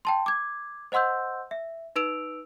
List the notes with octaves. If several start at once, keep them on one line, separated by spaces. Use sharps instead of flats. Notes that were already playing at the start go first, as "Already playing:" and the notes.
G5 A5 C6
D6 G#6
C5 D#5 F#5 C6 E6 G6
E5
D#4 B4 E6 D7 F7